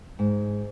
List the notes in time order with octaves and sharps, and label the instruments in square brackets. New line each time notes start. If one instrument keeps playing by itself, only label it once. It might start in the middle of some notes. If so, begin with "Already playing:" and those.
[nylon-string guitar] G#2